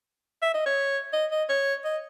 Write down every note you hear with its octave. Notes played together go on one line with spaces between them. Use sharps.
E5
D#5
C#5
D#5
D#5
C#5
D#5